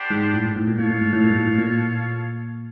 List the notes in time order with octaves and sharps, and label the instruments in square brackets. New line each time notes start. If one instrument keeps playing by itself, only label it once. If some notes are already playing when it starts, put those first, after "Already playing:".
Already playing: [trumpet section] B3 D4 G4 C5
[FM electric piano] G#2
A2
G#2
A2
A#2
[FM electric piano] A2 [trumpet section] F4 A4 C#5 F5
[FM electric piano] A2
G#2
A2
A#2
G#2
A2
A2
A#2